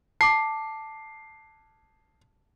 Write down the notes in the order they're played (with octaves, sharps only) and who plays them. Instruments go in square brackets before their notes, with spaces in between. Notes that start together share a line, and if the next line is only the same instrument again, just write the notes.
[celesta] A5 D6 [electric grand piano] C7